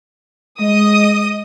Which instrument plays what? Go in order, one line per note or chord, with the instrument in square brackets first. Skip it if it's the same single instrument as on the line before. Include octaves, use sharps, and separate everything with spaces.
[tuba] G#3 [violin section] D#5 D#6